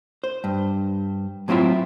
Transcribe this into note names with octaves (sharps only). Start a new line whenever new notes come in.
C5
G2
A2 F#3 C4 E4 F4 E5